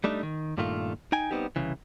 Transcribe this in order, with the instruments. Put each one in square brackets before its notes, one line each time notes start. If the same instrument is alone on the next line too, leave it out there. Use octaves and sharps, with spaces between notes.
[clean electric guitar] G3 A3 D4 D#4
D#3
G2 A#2 D#3 A3 F4
D#4 G5 G#5
G3 B3 C4 D#4 G4
C2 C#3 E3